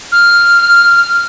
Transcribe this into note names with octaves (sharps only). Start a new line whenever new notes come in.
F6